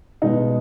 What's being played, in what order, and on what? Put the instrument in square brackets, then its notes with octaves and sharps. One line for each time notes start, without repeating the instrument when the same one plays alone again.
[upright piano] B2 G#3 B3 D#4